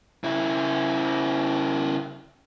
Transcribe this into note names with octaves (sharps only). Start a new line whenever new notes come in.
C#3 E4